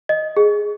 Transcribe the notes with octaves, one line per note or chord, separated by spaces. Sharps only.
D#5
G#4